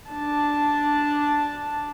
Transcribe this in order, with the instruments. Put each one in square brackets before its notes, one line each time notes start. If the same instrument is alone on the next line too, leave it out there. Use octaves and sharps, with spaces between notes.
[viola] D4 A5